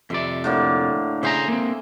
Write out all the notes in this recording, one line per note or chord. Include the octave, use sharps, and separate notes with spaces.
F2 C3 D5 E5
A2 D3 A#3
C#3 G#4 C5 D#5 E5 A#5
A#3 C4